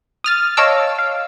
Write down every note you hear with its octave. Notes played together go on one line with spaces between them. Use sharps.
D#6 F6 A6
C#5 D#5 F5 A5 D6 E6
F5